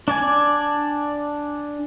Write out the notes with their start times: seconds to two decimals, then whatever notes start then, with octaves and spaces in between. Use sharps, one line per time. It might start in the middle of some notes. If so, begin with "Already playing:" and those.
0.08 D4 D5 G#5